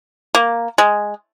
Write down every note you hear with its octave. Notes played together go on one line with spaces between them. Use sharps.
A#3
G#3